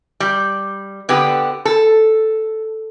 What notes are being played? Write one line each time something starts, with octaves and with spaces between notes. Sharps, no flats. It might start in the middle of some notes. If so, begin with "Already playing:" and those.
G3
D3 B3 G4
A4